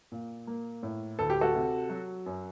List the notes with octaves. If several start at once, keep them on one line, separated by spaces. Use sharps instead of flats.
A#2
A#3
A2
D2 A4
G4
F#4 A4
C3
F#3
F#2